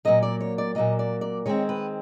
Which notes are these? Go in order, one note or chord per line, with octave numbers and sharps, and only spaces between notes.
A#2 F#3 A#3 D#5
D5
C#5
D5
A#2 F#3 A#3 D#5
D5
D5
D#3 G#3 C4 C#5
B4